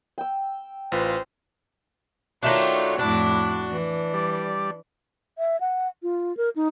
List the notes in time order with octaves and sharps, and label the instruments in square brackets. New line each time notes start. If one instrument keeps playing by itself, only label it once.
[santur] G5 E6
[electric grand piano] A1 F4 B4 [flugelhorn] C5
[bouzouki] D#3 A3 D4 [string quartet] F4 C#5 [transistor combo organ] F#4
[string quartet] F2 A2 E4 [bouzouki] D4
[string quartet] E3
[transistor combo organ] G3 D5
[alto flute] E5
F#5
F4
A#4
D#4